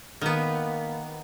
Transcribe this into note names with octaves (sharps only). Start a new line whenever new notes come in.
D#3 A#3 B3